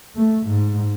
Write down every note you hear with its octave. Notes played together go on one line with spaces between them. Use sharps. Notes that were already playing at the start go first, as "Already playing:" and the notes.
A3
G#2